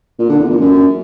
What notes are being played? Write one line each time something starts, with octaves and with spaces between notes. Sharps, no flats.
A#2
D3
E2
A#2
F#2